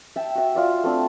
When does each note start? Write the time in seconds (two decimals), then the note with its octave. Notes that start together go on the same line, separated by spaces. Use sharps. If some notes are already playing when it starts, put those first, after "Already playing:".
0.16 E5 G5 A5
0.35 F#4 E5
0.55 F4 D5 E5
0.83 A3 C4 D4